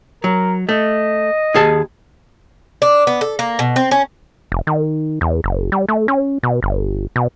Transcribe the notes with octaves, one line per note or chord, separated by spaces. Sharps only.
F#3 A#4
A3 D#5
D#2 G#4 A5
D4
B3
A4
A#3
B2
C4
C#4
F1
D#3
E2
F#1
G3
A3
C#4
B2
G1
B2